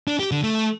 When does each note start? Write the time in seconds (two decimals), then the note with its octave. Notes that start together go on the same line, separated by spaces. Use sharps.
0.08 D4
0.20 G4
0.32 D3
0.43 A3